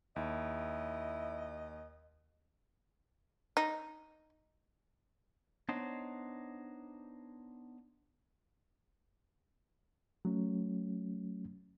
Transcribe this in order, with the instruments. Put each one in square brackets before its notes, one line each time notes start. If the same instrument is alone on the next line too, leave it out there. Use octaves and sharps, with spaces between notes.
[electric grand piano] D#2 [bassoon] E4 [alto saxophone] D#5
[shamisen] D#4
[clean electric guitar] B3 D4 D#4 C5 C#5 D#5
[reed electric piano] F#3 A3 C#4